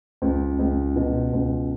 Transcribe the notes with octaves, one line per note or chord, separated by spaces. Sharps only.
C#2
C#2
B2
C#2